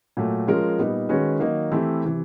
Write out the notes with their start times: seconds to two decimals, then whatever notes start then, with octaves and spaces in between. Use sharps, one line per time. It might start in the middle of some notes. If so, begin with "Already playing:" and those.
0.17 A#2 F#3 A3
0.48 F3 G#3 C#4 F4 A#4
0.78 A#2 G3 B3 D#4
1.09 D#3 G#3 C#4 F#4 B4
1.40 D#3 F#3 A#3 D#4
1.71 E3 A3 C4 E4 G4
2.04 C3 E3